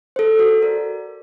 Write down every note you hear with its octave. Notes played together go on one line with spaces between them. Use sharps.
A4 C5
F#4
A#4 D5